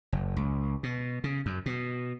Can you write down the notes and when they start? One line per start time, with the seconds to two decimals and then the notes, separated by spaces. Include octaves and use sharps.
0.12 F#1
0.36 C#2
0.83 B2
1.24 C#3
1.46 F#2
1.66 B2